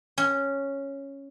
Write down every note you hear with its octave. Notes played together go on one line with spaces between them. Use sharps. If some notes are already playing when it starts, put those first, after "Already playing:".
C#4